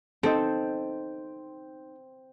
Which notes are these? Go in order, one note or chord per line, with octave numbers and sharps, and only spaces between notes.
C4 D#4 A4